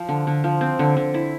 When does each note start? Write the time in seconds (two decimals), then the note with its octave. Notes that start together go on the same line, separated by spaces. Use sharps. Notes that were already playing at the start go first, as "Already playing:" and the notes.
Already playing: F3
0.09 D3
0.27 D3
0.44 F3
0.61 C4
0.79 D3
0.97 D3
1.14 E4